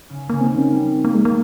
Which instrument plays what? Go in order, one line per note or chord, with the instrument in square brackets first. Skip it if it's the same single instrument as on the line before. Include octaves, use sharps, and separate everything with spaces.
[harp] C#3
[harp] C#3 [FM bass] A#3
[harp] D#3 [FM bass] C4
[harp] D#3 [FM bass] C#4
[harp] G3 [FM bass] C4
[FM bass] A#3
G#3
A#3